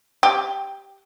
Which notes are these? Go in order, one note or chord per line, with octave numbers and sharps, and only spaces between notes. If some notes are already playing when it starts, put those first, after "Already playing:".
G4